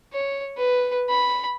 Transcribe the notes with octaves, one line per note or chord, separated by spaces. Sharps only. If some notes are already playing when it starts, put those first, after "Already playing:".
C#5
B4
B5